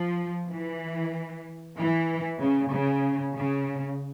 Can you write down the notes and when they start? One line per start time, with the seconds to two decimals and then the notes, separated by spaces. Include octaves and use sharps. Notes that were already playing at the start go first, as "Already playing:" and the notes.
Already playing: F3
0.50 E3
1.77 E3
2.41 C#3
2.73 C#3
3.37 C#3